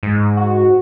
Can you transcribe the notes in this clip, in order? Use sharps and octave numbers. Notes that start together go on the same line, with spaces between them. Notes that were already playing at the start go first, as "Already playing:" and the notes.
G#2
F#4